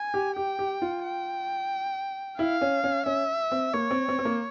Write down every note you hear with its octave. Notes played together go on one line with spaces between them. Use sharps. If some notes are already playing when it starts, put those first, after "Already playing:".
Already playing: G#5
G4
G4 G5
G4
F4
G5
E4 F5
C#4
C#4
C#4 E5
C4
A#3 C#5
C4
C4
C4
A#3